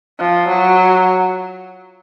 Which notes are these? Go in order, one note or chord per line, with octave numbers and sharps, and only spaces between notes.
F3
F#3